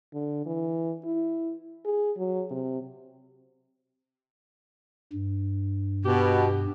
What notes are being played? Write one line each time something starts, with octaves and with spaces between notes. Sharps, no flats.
D3
E3
E4
G#4
F#3
C3
G2
B2 G4